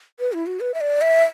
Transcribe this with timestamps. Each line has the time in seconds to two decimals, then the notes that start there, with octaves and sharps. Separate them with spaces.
0.20 B4
0.33 E4
0.47 F#4
0.60 B4
0.74 E5
0.81 D5
1.01 E5